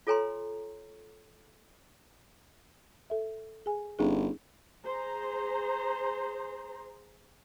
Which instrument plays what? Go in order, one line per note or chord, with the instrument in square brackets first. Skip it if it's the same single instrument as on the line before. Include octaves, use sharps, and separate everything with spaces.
[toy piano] F4 A4 C#5 G#5 A#5 C6
[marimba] A4 E5
G#4 G#5
[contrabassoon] G1 [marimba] C#4 D#4 G#4
[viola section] G#4 C5 A#5